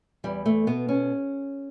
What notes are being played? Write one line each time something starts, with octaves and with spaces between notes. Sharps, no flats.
E2 G3
A3
B2 B3
C#4